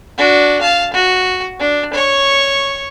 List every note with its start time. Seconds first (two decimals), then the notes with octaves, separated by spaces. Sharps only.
0.18 D4 F#4
0.61 F5 A5
0.94 F#4
1.60 D4
1.94 C#5 C#6